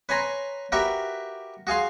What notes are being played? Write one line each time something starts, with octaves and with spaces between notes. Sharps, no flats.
B4 C#5 G#5 A#5 C6
F#4 G4 A#4 B4 E5
F#4 G#4 F5 C6